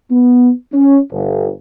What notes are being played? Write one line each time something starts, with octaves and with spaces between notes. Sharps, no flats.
B3
C#4
G1